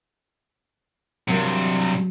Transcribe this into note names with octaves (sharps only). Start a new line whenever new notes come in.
G2 C3 F#3